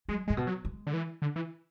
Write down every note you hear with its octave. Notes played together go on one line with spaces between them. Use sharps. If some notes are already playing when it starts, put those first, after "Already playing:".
F#3 G#3
A2 G#3
B2
F#3
G#3
D3
E3
D3
E3